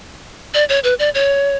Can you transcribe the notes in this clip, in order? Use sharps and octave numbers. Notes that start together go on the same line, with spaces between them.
D5
C#5
B4
D5
C#5